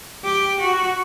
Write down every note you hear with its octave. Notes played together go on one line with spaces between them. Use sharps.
G4
F#4